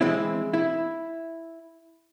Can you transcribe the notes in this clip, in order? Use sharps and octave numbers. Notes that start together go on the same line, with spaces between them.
E3 G#3 C4 E4
E4